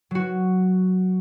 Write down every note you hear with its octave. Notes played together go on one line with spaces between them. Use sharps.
F#3 F#4